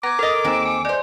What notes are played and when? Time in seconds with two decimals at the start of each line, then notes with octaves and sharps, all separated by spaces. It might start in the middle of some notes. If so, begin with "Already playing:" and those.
0.03 B3 A#5 D6 G#6 A#6
0.19 A4 A#4 C#5 D#5 F6 A6
0.44 D#2 G#3 C4 D#4 E6
0.65 G#5
0.85 G#3 C5 D5